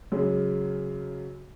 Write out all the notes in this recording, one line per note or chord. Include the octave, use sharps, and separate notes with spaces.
F#2 C#3 G#3